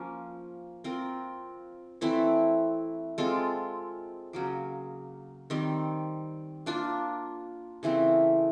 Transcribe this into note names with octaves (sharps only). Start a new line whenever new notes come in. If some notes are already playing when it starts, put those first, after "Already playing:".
Already playing: F3 A#3 C#4
C4 F4 A#4
E3 A3 C4 E4
G#3 C4 F4 A4
C#3 F#3 A#3
D#3 G3 C4
A#3 D4 F4
C#3 E3 A3 C4